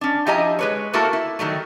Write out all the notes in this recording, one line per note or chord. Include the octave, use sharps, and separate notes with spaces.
C#4 D4
F3 E4 G4 D#5 G#5 A#5
G#3 B4 C#5
A3 A#3 E4 F#4 A4 A#4
E4
D#3 F#3 G3 A3